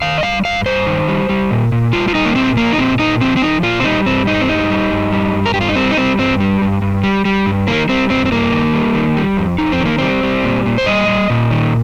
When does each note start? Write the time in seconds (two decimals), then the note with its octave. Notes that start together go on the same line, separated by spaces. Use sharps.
0.02 D#3 F5
0.18 D#5
0.23 G3 F5
0.45 G2 F5
0.66 G2 C5
0.87 D#3
1.08 G3
1.29 G3
1.51 A#2
1.72 A#2
1.93 G3 F4
2.08 F4
2.15 G3 D#4
2.25 A#3
2.35 A#2 C4
2.57 F3 A#3
2.73 D#4
2.78 A#2 C4
2.99 A#2 D#4
3.21 F3 C4
3.36 C4
3.42 F3 D#4
3.63 A#2 F4
3.80 C4
3.84 G3 D#4
4.06 G2 C4
4.27 G2 D#4
4.41 C4
4.48 G3 D#4
4.70 G3
4.91 G2
5.12 G3
5.34 G2
5.46 A#4
5.54 G2 G4
5.61 F4
5.69 D#4
5.76 G3 C4
5.91 D#4
5.97 G3 C4
6.19 G2 C4
6.40 G3
6.62 G2
6.82 G2
7.03 G3
7.25 G3
7.46 G2
7.67 D#3 A#3
7.89 G3 C4
8.10 G2 C4
8.26 C4
8.32 G2 A#3
8.53 D#3
8.73 G3
8.95 D#3
9.17 G3
9.37 F2
9.58 F2 D#4
9.72 C4
9.80 D#3
9.85 A#3
9.98 G3 C4
10.23 G3
10.44 A#2
10.66 A#2
10.78 C5
10.86 G3 D#5
11.08 G3
11.30 A#2
11.51 D#3